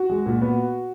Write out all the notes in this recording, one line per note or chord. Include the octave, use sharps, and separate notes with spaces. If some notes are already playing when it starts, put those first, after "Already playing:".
Already playing: F#4
G#3
A#2
B3